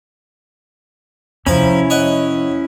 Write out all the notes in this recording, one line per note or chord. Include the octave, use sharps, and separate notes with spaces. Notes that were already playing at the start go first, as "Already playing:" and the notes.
F2 C3 F3 C#4 E4 A#5 B5
C#5 D#5 F#5